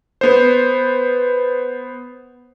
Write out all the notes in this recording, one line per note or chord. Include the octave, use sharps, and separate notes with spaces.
B3 C5